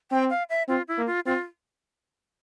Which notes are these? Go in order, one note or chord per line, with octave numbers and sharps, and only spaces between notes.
C4 G5
F5
E5
C4 F4
E4
A#3
F4
C4 F4